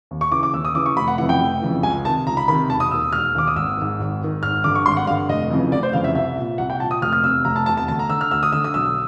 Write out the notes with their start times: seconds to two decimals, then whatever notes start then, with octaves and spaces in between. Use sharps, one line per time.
0.11 D#2
0.21 C#6
0.32 C#3 E3 D6
0.43 D6
0.53 D#2 E6
0.65 D#6
0.75 C#3 E3 D6
0.86 C#6
0.96 F1 B5
1.08 F#5
1.18 F2 C#3 E3 F#5
1.29 G5
1.40 F1
1.62 F2 C#3 E3
1.83 C#2 G#5
2.05 C3 D#3 A5
2.27 C#2 A#5
2.37 B5
2.48 C3 D#3 B5
2.69 E1 A5
2.80 D#6
2.91 D#2 D#3 E6
3.13 E1 F6
3.35 D#2 D#3 D6
3.47 D#6
3.56 G#1 E6
3.77 G#2 D#3
3.99 G#1
4.21 G#2 D#3
4.43 G#1 F6
4.64 G2 D3 D6
4.75 C#6
4.86 G#1 C6
4.97 F#5
5.07 G2 D3 F5
5.29 F1 D#5
5.50 F2 C#3 E3
5.72 F1 D5
5.83 C5
5.93 F2 C#3 E3 F5
6.04 E5
6.15 C2 E5
6.37 A#2
6.58 C2 F#5
6.70 G5
6.80 A#2 A5
6.91 D#6
7.02 F1 F6
7.13 F6
7.23 E2 C3 E6
7.45 F1 A#5
7.56 A5
7.66 E2 C3 A5
7.77 A5
7.88 D2 A5
7.99 A#5
8.10 D3 E6
8.21 F6
8.31 D2 E6
8.43 D#6
8.53 D3 E6
8.64 D#6
8.74 B1 E6